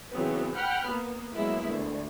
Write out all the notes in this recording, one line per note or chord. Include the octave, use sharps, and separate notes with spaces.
C#3 E3 F#3 B3 C4
F#5 G5 B5 F6 F#6
A#3 B3
F#3 G#3 A#3 B3 E4
D2